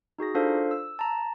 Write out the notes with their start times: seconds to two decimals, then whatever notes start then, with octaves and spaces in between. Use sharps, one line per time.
0.18 D#4 F#4 G#4 A#6
0.35 D4 F4 A4 C5 F5
0.71 E6
0.99 A5 A#5